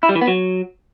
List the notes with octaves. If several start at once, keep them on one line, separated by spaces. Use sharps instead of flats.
E4
G3
E3
B3
F#3